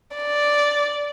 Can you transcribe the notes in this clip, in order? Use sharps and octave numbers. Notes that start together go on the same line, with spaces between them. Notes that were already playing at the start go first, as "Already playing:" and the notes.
D5